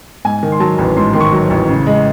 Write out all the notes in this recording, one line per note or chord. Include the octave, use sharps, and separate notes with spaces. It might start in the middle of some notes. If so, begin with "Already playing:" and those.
G#2 G#5
D#3
C6
F#3 A5
A1
G#2 C6
D#3 C6
C#6
F#3
A1
C#3
G#3